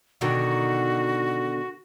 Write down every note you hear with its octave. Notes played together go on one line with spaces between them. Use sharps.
B2 D3 D#3 F#4